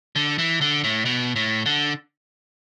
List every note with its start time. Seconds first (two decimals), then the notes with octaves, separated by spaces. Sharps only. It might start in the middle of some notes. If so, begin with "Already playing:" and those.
0.16 D3
0.38 E3
0.61 D3
0.84 A2
1.05 B2
1.36 A2
1.66 D3